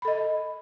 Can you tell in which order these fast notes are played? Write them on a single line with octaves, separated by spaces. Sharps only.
B5 A4 D#5